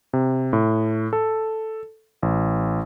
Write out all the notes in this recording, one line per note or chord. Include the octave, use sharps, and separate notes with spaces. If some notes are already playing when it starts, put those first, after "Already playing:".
C3
A2
A4
A1